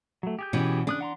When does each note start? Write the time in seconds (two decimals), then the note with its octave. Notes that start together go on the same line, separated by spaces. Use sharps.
0.23 F#3 A3
0.39 G4 G#4 G6
0.53 B2 E3 C#4
0.87 C#3 D4 D#6 F#6
1.01 F#5 A#5 C6